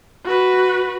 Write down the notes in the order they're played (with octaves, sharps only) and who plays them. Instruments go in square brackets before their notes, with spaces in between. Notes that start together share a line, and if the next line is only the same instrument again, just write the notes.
[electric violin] F#4 B4